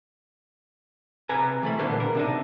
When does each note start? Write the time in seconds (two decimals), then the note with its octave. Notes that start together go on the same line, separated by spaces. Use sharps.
1.29 C3 B4 G#5 A#5
1.63 E3 A3 B5
1.79 A#2 D3 A#3 B3
2.00 A#4
2.15 C3 D4 D#4